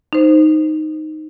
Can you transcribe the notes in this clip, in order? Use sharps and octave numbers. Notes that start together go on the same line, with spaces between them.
D#4 C5